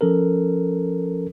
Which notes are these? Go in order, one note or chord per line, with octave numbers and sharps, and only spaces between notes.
F3 C#4 A4 A#4